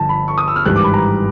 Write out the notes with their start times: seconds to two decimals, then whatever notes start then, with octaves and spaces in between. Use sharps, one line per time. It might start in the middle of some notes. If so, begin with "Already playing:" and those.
Already playing: G1 G2 D3 F3 A5
0.09 B5
0.28 C#6
0.38 D#6
0.48 E6
0.56 F6
0.65 G#1 G2 E3 G3 F#6
0.76 D6
0.84 B5
0.94 A#5